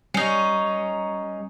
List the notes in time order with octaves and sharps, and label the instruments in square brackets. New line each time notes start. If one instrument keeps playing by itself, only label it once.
[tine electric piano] G3 C7 [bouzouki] C#4 D#4